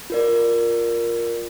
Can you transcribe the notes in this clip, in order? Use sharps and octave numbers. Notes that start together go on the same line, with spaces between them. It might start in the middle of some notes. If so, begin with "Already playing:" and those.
F4 A#4 D5